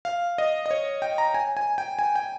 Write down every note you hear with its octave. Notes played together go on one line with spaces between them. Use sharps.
F5
D#5
D#5
C#5
G5
A#5
G#5
G#5
G5
G#5
G5